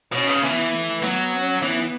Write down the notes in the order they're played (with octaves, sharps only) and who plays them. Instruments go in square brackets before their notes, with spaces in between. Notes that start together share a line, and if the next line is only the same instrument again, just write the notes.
[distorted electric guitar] B2 [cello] C#4
[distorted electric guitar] C#3
[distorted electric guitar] E3 [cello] B3
[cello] A3
[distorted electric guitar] F#3 [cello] B3
[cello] C#4
[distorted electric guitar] E3 [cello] B3